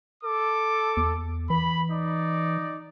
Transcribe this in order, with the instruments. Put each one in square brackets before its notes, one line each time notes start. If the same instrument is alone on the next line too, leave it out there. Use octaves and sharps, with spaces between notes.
[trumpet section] A4 D6
[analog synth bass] E2
[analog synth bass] E3 [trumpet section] B5
[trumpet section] D#4 D5